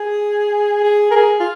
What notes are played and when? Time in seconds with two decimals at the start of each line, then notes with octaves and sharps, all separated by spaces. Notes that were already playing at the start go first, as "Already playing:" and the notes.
Already playing: G#4
0.83 G#4
1.11 A#4
1.16 G#4
1.40 F4